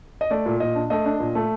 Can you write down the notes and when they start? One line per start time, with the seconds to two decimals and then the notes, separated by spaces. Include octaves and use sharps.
0.21 D#5
0.30 A3 D5
0.46 A#2
0.60 A#2 D#5
0.75 D4
0.90 A3 D#5
1.05 D4
1.20 A#2
1.35 A3